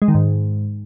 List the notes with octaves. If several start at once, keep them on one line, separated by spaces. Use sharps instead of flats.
G#3
D#3
G#2